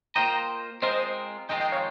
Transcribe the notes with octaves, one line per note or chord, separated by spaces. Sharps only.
A#3 F4 C5 D#5 G5 A#5
G#3 C4 F4 A#4 C5 D#5
F2 D#3 G#3 C4 F4 D#5 G5
D#5 G5
C#5 F5